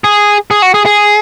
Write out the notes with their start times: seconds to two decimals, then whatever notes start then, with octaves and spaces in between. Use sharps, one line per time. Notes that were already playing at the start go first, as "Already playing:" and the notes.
0.04 G#4
0.51 G#4
0.62 F#4
0.74 G#4
0.86 G#4